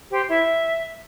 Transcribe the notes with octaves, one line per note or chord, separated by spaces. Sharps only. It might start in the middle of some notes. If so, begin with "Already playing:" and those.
G4 C5
E4 E5